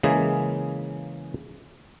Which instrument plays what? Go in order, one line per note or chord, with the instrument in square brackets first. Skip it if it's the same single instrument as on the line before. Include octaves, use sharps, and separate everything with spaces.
[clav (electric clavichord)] C#3 E3 G#3 A#3 G#4